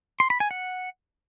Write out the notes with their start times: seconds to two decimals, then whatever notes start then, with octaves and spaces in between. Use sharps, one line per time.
0.20 C6
0.30 B5
0.40 G#5
0.51 F#5